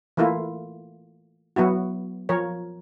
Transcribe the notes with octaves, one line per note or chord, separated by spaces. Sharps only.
E3 A3 A#3 E4 F4
F#3 B3 E4 F#4
F3 A#4 C#5